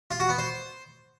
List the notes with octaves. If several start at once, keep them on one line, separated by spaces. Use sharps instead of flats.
F4
F#4
B3
C5